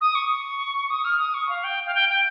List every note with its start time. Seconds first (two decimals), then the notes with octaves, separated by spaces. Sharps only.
0.01 D#6
0.15 C#6
0.90 D#6
1.05 F6
1.19 D#6
1.34 C#6
1.49 F5
1.64 G5
1.86 F5
1.95 G5
2.09 G5